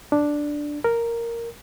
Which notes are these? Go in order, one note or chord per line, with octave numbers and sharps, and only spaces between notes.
D4
A#4